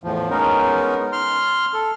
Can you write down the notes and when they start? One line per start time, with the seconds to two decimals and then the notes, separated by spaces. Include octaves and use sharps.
0.04 E2 A2 F3
0.30 G#3 B3 C#4 D#4 A#4
1.12 C6 F6
1.74 A4